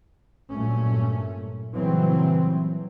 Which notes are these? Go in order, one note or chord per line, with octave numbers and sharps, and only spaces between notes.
G2 A#2 F#3 A3 C#4
A#2 C#3 E3 F#3 G3 C4